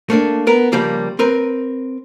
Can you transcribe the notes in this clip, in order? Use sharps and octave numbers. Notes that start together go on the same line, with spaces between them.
A3 A#3 D4
B3 A#4
C#3 F3 G3 A#3
C4 A#4 B4